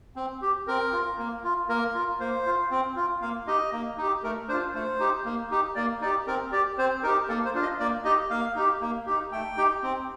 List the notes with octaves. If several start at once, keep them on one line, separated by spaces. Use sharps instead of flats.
C4
G4
C4 A#4
F4
A#3
F4
A#3 A#4
F4
A#3 C5
F4
C4
F4
A#3 F5
D#4 G4 D#5
A#3
D#4 G4
A3 A#4
D4 F4 C5
A3 C5
D#4 G4
A#3
D#4 G4
A#3 D5
D#4 G4 D5
C4 A#4
G4 D5
C4 C5
D#4 G4 A#4
A#3 A4
C5
D4 F4
D#5
A#3 D5
D#4 G4 D#5
A#3 F5
D#4 G4
A#3
D#4 G4
A3 G5
D#4 G4
C4